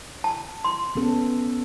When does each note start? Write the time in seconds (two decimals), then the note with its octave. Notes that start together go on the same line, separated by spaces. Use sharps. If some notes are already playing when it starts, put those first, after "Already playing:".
0.24 A5
0.65 C6
0.96 B3 C#4 A4